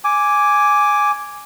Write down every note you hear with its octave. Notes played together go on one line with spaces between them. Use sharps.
G#5 D6